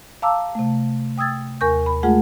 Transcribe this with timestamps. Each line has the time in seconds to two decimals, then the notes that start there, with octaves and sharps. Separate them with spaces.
0.22 F5 A5 A#5 D6 E6
0.55 C3 A3
1.18 G5 D#6 E6 G#6 A6
1.61 D#2 A#4 G#5 C#6 G6
1.86 B5
2.03 G#3 A3 F4 G#4 F#5